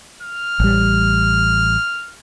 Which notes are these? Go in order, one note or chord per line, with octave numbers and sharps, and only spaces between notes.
F6
A1 G3